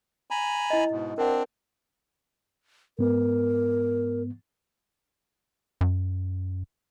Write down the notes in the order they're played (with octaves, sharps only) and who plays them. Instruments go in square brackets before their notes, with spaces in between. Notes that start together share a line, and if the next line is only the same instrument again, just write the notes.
[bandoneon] G#5 A#5 B5
[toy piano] E4 D#5
[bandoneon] G#2 B2
[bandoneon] C4 D4 [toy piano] A#4 F#5
[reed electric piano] G#2 B3 [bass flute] A#4
[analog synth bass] F#2